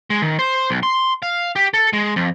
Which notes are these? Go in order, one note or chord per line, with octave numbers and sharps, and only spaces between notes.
G#3
D#3
C5
B1
C6
F5
G4
A4
G#3
F2